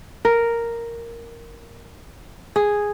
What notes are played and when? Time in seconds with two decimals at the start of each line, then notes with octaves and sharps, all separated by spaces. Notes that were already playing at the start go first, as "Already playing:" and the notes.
0.25 A#4
2.56 G#4